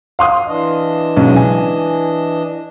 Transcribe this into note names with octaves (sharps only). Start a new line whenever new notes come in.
F5 C6 D#6
E3 D4 D#5
B1 C#3 G#3
G#5